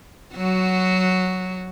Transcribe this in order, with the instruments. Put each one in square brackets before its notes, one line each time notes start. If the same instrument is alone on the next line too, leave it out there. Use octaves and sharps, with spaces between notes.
[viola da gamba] F#3 F#4